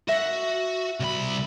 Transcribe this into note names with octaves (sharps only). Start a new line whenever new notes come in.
F#4 E5 A#6
C2 B5